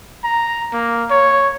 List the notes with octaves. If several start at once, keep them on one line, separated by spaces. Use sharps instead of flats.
A#5
A#3
C#5